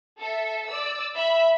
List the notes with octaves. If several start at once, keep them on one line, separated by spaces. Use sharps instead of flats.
A4 E5
D5 E6
E5 B5